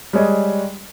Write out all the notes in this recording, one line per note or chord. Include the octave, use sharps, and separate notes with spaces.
G3 G#3 C#5 D#5